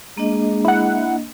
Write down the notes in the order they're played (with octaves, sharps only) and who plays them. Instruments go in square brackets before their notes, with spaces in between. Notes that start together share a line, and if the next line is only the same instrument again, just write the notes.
[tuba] G#3 [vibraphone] A#3 D4 D#5
[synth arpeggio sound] E4 F#5